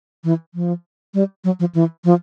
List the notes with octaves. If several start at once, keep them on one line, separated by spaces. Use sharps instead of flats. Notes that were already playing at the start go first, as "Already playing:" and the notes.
E3
F3
G3
F#3
F3
E3
F3